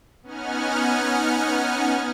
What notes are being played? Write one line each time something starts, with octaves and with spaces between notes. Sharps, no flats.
B3 C#4 D#4 F#5 G#5 F6